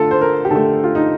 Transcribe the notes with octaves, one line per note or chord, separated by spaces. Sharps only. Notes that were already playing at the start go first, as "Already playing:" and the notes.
Already playing: D3 A3 F4 A4
C5
A#4
G4
D3 A3 A4
F4
D#4